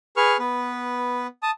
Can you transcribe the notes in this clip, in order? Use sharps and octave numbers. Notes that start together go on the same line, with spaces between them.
G#4 B4 C#6 F6
B3 B4
A5 D#6